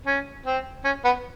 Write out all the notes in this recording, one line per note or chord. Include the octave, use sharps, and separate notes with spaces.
C#4
C4
C#4
B3